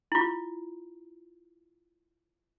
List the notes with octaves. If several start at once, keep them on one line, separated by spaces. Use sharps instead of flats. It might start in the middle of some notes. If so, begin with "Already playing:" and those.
E4 F4